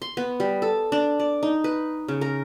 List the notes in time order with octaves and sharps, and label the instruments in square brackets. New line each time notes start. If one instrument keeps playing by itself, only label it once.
[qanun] C6
B3
G3
A4
D4
D5
D#4
B4
C#3
A#4